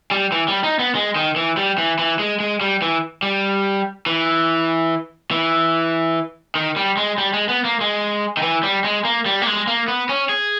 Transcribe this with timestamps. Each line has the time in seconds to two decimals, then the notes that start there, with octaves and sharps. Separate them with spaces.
0.11 G3
0.32 E3
0.48 G3
0.64 D#4
0.79 B3
0.95 G#3
1.16 D#3
1.36 E3
1.57 G3
1.78 E3
1.99 E3
2.19 G#3
2.40 G#3
2.61 G3
2.82 E3
3.23 G3
4.06 E3
5.31 E3
6.55 D#3
6.76 G3
6.97 G#3
7.18 G3
7.33 G#3
7.49 B3
7.65 A#3
7.81 G#3
8.37 D#3
8.42 E3
8.63 G3
8.84 G#3
9.05 A#3
9.26 G3
9.42 A#3
9.47 G#3
9.67 A#3
9.88 B3
10.09 C#4
10.29 G#4